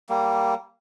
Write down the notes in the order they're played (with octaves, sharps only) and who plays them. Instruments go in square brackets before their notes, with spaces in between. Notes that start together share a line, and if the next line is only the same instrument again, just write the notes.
[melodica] G3 A#3